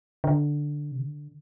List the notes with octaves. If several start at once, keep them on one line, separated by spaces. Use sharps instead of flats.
D3
C3
D3